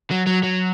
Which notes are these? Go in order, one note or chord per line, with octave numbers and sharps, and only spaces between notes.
F#3
F#3
F#3